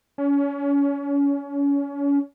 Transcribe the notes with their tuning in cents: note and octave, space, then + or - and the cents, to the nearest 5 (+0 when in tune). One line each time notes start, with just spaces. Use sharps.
C#4 +30